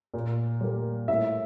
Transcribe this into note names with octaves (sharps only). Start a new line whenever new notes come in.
A#2
G3 A#3
A2 E5